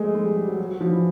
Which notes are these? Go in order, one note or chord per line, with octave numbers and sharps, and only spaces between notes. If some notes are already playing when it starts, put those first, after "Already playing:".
Already playing: G#3 A3
G#3
G3
G3
F#3
F#3
F#3
F3
E3